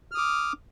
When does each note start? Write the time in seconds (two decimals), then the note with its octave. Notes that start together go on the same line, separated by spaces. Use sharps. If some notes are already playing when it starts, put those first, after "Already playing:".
0.11 F6
0.15 D#6
0.18 D6